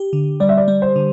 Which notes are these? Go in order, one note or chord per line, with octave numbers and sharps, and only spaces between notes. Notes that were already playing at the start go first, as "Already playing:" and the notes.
Already playing: G4
D3
G3 D5
E5
D5
G3
C5
D3